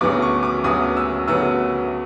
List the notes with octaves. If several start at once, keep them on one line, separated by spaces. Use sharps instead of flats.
D2 C#3 F#3 B3 D6
C#6
D6
D2 C#3 F#3 B3 D#6
E6
D2 C#3 F#3 B3 E6